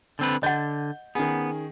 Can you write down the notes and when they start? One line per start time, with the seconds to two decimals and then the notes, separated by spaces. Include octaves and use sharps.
0.19 D3 C4 B4
0.43 D3 D#5 F#5 G6
1.15 D#3 B3 C#4 G#4